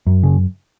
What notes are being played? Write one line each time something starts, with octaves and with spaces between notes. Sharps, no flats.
F#2
C#3